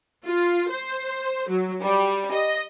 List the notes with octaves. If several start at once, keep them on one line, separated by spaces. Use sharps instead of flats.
F4
C5
F#3
G3
D#5